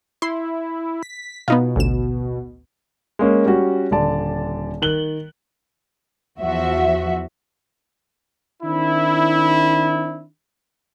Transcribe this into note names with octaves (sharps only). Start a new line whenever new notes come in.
E4 C6
B6
B2 B3 D#4 F4
A1 D2 E7
G#3 A#3 C#4
G3 C#4 F#4
D#1 D3 D5 A5
D#3 F#6 F#7 G7
E2 F3 F#4 E5
D#3 C4 D4 E4